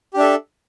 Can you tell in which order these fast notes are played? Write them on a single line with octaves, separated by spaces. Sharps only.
G4 D4 E5 A4